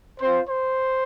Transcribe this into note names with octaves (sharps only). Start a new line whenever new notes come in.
C4 F4 C5
C5